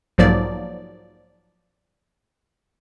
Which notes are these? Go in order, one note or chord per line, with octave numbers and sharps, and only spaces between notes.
B1 G#2 F3 F#3 A#3 D5